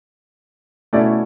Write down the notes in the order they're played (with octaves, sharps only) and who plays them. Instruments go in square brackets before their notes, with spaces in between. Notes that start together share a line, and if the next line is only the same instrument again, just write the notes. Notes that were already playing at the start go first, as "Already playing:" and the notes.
[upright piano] B2 A3 C#4 E4 D5